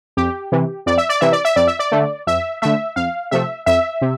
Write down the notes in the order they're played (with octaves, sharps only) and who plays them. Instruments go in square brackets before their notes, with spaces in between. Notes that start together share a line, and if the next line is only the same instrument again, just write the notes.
[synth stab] F2 G4
C3 E3
F2 D5
E5
D5
C3 E3 E5
D5
E5
F2 D5
E5
D5
D3 A3
F2 E5
D3 A3 E5
F2 F5
C3 F3 A3 E5
F2 E5
C3